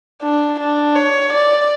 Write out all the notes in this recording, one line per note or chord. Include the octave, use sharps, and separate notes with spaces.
D4
D4
C#5
D5